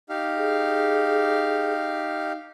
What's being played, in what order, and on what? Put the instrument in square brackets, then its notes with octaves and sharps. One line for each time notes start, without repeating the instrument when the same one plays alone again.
[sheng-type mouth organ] D#4 G4 F5
[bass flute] G#4